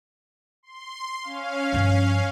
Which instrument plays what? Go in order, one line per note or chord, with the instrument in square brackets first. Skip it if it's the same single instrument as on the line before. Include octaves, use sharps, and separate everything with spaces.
[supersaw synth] C6
C#4 F5
[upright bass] G2 F3